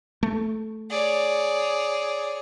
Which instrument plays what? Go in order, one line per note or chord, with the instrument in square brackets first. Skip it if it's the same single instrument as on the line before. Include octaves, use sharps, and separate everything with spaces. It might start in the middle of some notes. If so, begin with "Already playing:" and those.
[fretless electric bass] A3
[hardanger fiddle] G#4 C#5 [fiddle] D5